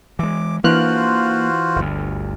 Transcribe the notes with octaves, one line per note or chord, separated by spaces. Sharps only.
E3 G#3 D6
E3 A#3 D4 F4 F#4 C5 F6 F#6
G1 D2